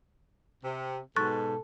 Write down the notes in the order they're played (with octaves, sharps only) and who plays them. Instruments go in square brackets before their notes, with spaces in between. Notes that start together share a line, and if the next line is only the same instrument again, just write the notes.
[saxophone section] C3
[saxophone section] G#2 B2 [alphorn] A4 [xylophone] C#6 F#6 A6